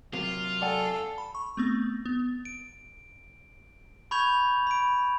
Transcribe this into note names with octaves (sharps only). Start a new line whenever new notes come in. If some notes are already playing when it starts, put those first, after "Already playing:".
C3 F#3 A#3 F4
A4 D5 F#5 G#5
B5
C#6
A3 B3 C4
B3
D7
B5 C#6 G6 G#6 F7
B5 D7